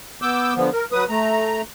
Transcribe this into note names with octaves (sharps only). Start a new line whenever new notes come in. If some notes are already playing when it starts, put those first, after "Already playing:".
B3 D6 E6 G6
D3 F3 B3
A#4
F#3 B4 D#6
A3 A#5